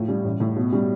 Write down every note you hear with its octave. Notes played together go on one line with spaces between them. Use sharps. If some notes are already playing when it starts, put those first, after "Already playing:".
Already playing: A2 F3
G3
A1
A2
B2
G3